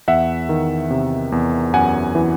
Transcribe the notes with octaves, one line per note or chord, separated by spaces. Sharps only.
E2 E5 F#5
D#3
C3
E2
F#2 F#5 G#5
E3